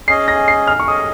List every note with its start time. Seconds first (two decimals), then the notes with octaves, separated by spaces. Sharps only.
0.07 C#4 G#4 D#5 C7
0.28 A#6
0.48 C7
0.67 F6
0.80 C#6
0.87 C#4 G#4 D#5 D#6